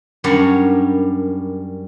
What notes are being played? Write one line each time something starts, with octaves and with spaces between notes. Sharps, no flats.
F#2 G3 D4 A#4 C#5 F#5